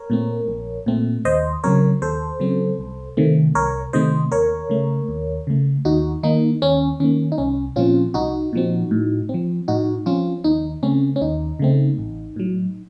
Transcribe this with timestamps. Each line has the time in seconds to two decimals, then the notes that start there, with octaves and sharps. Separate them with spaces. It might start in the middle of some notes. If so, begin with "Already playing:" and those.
Already playing: A#4 C#5
0.10 A#2 A3 C4
0.48 A#1
0.86 A#2 A3 C4
1.25 D#2 C5 D#5
1.64 C#3 F#3 C4 A#4 C#5
2.02 D#2 A4 C5
2.40 C#3 F#3 C4
2.79 C2
3.17 C3 D#3 A3 C4
3.55 C2 A#4 C#5
3.93 C3 D#3 A3 C4 C5 D#5
4.32 D#2 A#4 C#5
4.70 C#3 A3
5.08 D#2
5.47 C#3 A3
5.85 D#2 D#4 F#4
6.23 D#3 A#3 D#4
6.62 D#2 C#4
7.00 D#3 A#3 C#4
7.32 D#4
7.38 C2 C#4
7.76 A#2 F3 C4 C#4 F4
8.14 C2 D#4 F#4
8.53 A#2 F3 C4
8.91 A2
9.29 C4
9.34 F3
9.68 A2 D#4 F#4
10.06 F3 C4 C#4 F4
10.44 D#2 D#4
10.83 C#3 A3 C4 C#4
11.16 C#4
11.21 D#2 D#4
11.59 C#3 A3 C4
11.98 A1
12.36 A2 F#3